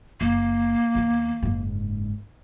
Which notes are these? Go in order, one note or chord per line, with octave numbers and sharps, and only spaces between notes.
F#1 A#3
D#2 B3
F#1 G#2